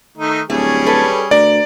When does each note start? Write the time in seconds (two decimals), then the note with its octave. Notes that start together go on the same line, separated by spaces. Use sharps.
0.18 D#3 A3 D#4
0.50 D1 G3 A3 C#4 G#4
0.86 A4 B4
1.31 D2 A#4 D5